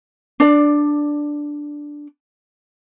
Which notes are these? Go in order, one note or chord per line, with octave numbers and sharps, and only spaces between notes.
D4 D5